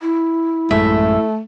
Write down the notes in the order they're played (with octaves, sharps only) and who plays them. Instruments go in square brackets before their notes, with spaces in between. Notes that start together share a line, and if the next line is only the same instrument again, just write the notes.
[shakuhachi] E4
[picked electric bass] A1 F#2 G#3 [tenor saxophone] A3 [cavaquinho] E5